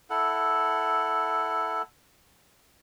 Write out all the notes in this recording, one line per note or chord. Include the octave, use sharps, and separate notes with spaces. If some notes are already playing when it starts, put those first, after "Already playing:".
E4 A4 F#5